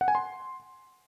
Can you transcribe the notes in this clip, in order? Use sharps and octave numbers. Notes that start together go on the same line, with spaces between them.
F#5
G#5
C6